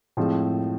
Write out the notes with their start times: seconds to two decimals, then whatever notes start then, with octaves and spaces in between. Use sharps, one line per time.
0.17 A2 F3 G#3 C4